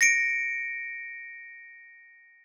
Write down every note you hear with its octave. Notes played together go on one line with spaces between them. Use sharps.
A#6 C#7 D7